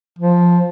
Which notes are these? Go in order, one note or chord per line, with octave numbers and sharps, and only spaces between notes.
F3